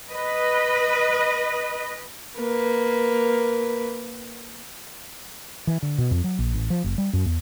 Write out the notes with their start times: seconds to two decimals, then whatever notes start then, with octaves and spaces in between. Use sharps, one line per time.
0.10 B4 D#5
2.39 A#3 B4
5.67 E3
5.83 D3
5.98 B2
6.11 F2
6.24 F#3
6.39 A#1
6.54 A1
6.70 F3
6.84 F#1
6.98 G3
7.13 F#2
7.26 E2